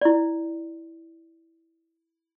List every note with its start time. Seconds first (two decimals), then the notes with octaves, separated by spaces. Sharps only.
0.01 E4 D5